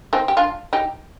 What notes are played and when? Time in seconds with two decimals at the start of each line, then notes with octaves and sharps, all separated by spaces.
0.13 C4 D#4
0.28 G4
0.37 D4 F4
0.73 D#4 G4